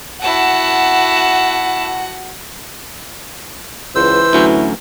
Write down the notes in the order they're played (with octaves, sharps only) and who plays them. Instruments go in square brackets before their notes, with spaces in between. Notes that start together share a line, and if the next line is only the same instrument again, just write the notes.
[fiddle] E4 A5 [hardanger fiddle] F#4 F#5
[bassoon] C#2 [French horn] E3 [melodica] C5 E6
[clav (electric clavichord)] D2 F#3 C#4 [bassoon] E4